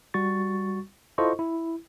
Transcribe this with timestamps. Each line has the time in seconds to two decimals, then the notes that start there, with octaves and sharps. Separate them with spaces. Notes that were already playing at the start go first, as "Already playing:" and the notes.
0.14 G3 F#4 C#6 A6
1.18 E4 F4 A4 C5 D#5 C#6
1.39 E4